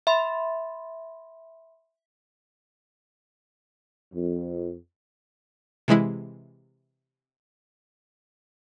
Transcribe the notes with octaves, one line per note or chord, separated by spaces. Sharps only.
E5 B5 C6
F2
C3 E3 G#3 E4